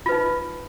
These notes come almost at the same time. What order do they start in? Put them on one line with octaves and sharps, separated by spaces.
F4 B4 D#4